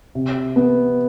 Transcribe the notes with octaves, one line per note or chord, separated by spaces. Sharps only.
C3
B3